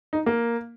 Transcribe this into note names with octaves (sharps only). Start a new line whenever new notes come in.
D#4
A#3